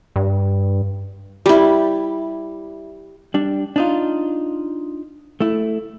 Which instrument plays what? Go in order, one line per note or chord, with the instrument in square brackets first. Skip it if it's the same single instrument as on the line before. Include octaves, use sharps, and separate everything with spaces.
[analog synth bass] G2
[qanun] G3 E4
[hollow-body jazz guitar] G3 D4
D4 D#4 F4
A3 E4